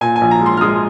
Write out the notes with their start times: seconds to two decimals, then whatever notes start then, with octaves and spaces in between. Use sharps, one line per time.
0.01 A#2 G#5
0.16 G#5
0.21 A#1
0.31 A#5
0.41 G#3 C6
0.57 F6
0.61 G#3 D#6